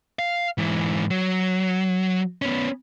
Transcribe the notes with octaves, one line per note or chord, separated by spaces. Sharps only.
F5
G#2 E3
F#3
B3 C#4